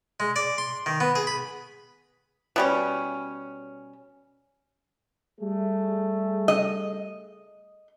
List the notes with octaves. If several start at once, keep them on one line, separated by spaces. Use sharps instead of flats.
G#3
D5
C6
D#3
B3
G#4
B5
B2 G3 C#4
G3 A3 G#4
D#5